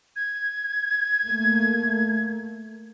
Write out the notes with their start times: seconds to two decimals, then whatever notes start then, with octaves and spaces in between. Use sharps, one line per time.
0.16 G#6
1.27 A3 A#3